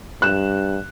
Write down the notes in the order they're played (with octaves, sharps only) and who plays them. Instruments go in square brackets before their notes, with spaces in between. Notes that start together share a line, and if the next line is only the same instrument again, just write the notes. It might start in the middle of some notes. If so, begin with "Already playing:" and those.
[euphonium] G2 [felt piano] F#6 E7